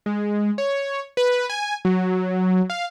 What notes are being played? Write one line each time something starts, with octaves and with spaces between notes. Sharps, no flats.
G#3
C#5
B4
G#5
F#3
F5